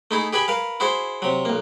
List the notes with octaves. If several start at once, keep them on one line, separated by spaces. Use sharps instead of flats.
A3 D#4 E4 G#4
G4 G#4 B4 G#5 B5
A#4 B4 F5
E4 F#4 G#4 C5
C3 F#3
B1 A#3